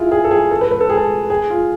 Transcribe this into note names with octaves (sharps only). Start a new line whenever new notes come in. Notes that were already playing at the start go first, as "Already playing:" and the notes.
Already playing: E4 F4 G#4
G#4
A4
G#4
A4
B4
B4
A4
G#4
A4
G#4
F4